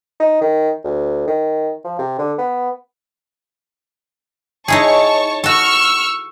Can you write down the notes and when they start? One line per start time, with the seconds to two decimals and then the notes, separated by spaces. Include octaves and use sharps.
0.20 D#4
0.41 D#3
0.84 D2
1.28 D#3
1.85 F3
1.99 C3
2.18 D3
2.39 B3
4.68 D#4 E4 G#4 C#5 A5 C#6
5.44 F#4 A4 C#6 E6 F6